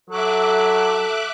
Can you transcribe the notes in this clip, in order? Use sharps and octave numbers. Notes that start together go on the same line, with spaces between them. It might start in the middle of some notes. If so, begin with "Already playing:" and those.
F#3 A4 E5 D6 F#6